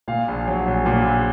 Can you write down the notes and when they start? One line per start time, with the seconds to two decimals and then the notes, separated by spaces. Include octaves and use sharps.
0.08 A#2 F5
0.28 A#1
0.48 F#3
0.67 A#1
0.86 A#2
1.05 A#1